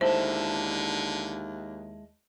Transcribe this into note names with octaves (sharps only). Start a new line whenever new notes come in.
D#2 D3 G#3 E4 A4 C5